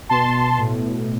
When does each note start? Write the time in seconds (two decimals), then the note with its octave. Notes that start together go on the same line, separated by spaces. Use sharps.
0.09 B2 A5 C6
0.34 B2
0.59 A2
0.83 A2